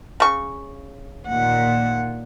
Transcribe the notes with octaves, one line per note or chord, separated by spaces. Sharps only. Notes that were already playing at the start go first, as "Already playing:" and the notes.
C#3 C#6
D#2 A#2 F#5